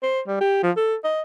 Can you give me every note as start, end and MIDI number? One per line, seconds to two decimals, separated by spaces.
0.03 0.21 72
0.27 0.40 55
0.41 0.60 67
0.63 0.72 53
0.77 0.96 69
1.04 1.22 75